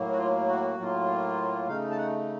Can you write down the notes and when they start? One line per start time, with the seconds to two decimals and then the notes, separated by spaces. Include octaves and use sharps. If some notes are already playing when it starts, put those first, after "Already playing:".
Already playing: A2 F#3 A#3
0.12 F#4
0.18 F4
0.48 F#4
0.78 A2 F#3 A#3 F4
1.67 C#3 A3 D#4 F5
1.91 A5
1.98 F#5